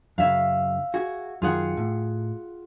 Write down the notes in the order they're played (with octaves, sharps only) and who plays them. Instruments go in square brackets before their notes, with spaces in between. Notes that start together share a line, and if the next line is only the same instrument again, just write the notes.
[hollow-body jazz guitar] F#2 C#3 [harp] E5 F5
[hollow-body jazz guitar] F#4 G#4
[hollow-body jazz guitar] F#2 D#3 [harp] F4 G#4 F#5
[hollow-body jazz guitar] A2